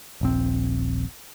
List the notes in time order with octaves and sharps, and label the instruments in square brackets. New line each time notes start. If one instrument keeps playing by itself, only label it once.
[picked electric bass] D#1 A#1 C4